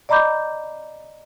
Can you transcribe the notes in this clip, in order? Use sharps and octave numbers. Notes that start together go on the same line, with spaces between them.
D5 D#5 A#5 B5 D6 G6